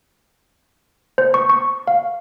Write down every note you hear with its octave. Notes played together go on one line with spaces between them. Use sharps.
C5
C#6
C#6
F5